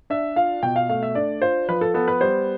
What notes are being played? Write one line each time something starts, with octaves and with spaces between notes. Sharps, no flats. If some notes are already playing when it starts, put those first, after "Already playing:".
D4 E5
F4 F5
B2 G5
F5
A3 F5
E5
D4 D5
F4 C5
F3 B4
A4
B3 A4
B4
G3 C5